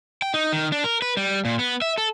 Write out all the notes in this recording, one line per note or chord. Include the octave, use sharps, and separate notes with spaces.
G5
D#4
D#3
D4
A#4
B4
G3
A#2
B3
E5
A4